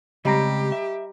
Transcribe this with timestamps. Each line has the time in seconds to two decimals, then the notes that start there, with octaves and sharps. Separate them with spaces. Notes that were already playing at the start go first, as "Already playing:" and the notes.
0.25 C#3 G3 G#3 C4 G4 D#5 A#5 A#6
0.72 E5